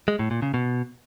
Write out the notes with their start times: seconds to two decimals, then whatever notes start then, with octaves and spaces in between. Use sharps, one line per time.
0.08 G#3
0.19 A2
0.31 A#2
0.42 C#3
0.54 B2